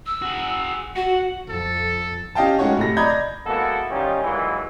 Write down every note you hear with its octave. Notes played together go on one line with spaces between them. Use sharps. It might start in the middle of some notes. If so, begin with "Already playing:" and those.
E6
F#4 G#4
F#4 F#5
F2 A4
C#4 G4 D#5 F5 G5 A5
G#3 A3 C#4 D#4 F#4 C#5
A2 C3 A#6
D5 D#5 A#5 B5 G6 G#6
A#6
G#3 A#3 B3 E4 F#4 A4
D#3 G3 C#4 D#4 F4 G4
D#2 A#2 E3 F#3 G#3